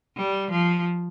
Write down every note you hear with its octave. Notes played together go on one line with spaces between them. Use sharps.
G3
F3